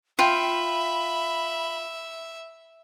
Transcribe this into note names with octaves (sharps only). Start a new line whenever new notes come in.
F4 E5 G5 B5